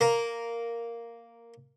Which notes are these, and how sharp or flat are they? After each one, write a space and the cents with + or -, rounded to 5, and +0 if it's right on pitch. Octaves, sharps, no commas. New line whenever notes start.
A#3 -5 A#4 +0